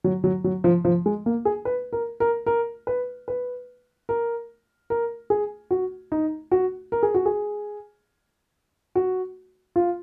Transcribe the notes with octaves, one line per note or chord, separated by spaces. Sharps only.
F#3
F#3
F#3
F3
F3
G#3
A#3
G#4
B4
A#4
A#4
A#4
B4
B4
A#4
A#4
G#4
F#4
D#4
F#4
A#4
G#4
F#4
G#4
F#4
F4